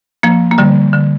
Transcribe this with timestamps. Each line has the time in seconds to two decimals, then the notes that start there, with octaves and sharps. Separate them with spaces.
0.23 F3 A#3
0.51 A#3
0.58 D3 G3
0.93 D3